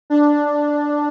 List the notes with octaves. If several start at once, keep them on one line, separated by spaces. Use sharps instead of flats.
D4